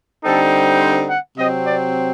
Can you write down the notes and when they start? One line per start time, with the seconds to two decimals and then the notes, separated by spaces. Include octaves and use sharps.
0.24 D3 G3 C4 D#4 A4
0.81 C5
1.09 F#5
1.37 C3 F#3 C4 D#5
1.66 D5